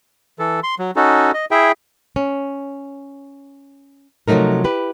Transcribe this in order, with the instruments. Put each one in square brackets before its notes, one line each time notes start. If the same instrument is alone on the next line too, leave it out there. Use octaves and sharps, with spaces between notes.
[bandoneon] E3 A4
C6
F#3
C#4 D#4 F#4 A4
D#5
E4 G#4 E5 G5
[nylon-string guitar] C#4
C3 F3 F#3 A3 D#4 A#4
E4 G4 B4